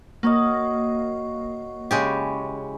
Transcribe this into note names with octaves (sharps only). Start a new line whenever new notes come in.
A#3 F#4 C#5 D#5
C#3 G#3 E4 G4 C#5